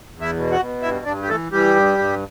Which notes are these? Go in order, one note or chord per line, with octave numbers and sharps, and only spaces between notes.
E2
E4 E5
B2
F#4 F#5
B2
G2 E4 E5
G2 D4 D5
G4
E3 A3 A4
E3 G3 G4
G2
G2